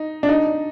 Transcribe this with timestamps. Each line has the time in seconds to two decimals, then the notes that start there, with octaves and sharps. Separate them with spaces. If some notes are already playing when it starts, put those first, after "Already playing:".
Already playing: D#4
0.23 D4
0.29 D#4